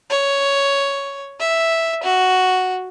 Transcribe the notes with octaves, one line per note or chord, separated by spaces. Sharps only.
C#5
E5
F#4